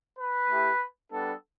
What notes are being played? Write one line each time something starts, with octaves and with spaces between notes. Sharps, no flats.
B4
A3 E4 G4
G3 B3 D4 A4